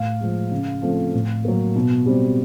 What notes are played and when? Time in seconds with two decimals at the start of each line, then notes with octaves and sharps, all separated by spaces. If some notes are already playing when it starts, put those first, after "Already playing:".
Already playing: A2 F5
0.21 F3 G#3
0.51 C#3
0.82 F3 A3 C4
1.14 A2
1.45 F#3 A#3
1.76 B2
2.06 G3 C4